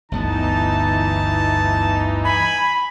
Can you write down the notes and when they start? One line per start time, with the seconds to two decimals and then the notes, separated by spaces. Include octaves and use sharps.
0.12 G1 D2 E3 B3 D#4 A5
2.25 G#5 B5